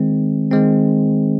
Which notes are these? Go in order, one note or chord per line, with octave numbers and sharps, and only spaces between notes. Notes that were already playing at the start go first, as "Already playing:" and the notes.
Already playing: D#3 G#3 C4
D#3 G#3 C4